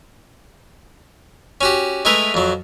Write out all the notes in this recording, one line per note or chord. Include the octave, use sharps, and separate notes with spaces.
C#4 F#4 G4
G#3 A3 E4 A#4 B4
F2 F#3